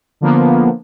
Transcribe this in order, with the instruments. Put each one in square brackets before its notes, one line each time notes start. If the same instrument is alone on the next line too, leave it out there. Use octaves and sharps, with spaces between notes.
[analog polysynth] D3 F3 A#3 B3